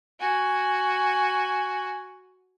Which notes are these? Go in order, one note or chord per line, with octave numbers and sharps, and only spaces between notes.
F#4 G#5